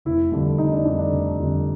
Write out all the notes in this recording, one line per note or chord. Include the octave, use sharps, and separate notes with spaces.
F1 E4
F2 D3 G3
F1 D#4
D4
F2 D3 G3 D4
D4
F1
F2 D3 G3